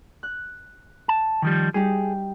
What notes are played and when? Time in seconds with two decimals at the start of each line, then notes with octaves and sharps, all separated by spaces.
0.23 F#6
1.08 A5
1.42 D#3 F3 G3
1.74 G3 D#4 G4 G#4